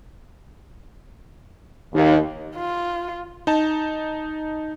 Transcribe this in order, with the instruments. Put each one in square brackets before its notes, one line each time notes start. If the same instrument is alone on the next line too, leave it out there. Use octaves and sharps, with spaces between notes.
[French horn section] D#2
[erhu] F4
[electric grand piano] D#4 A5